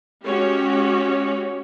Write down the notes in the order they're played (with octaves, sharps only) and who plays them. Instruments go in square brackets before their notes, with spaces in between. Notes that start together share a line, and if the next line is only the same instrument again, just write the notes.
[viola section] G#3 C#4 F#4 G4 C#5